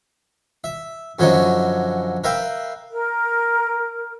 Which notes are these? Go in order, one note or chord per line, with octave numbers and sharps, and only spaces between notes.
E5
F#2 D3 F3 F#3 C#4 D#4
A#4 B4 E5 F5 G5
A#4